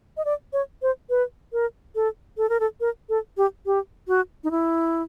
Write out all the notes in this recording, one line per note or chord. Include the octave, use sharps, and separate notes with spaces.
D#5
D5
C#5
C5
B4
A#4
A4
A4
A#4
A4
A#4
A4
G4
G4
F#4
D#4
E4